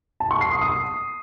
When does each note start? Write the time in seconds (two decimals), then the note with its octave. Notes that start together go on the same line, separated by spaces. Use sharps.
0.20 A5
0.31 C#6
0.41 C7
0.51 D#6
0.61 D#6